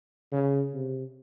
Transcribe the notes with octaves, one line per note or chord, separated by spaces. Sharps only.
C#3
C3